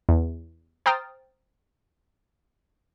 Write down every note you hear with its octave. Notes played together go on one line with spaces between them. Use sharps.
E2
C5 G5 A#5 D#6 F6 A6